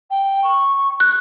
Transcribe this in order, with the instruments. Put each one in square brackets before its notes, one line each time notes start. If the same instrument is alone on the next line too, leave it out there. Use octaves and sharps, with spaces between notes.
[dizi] G5
C#6
[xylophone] F#6